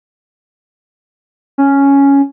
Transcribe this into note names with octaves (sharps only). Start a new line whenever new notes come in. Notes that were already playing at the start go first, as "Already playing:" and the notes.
C#4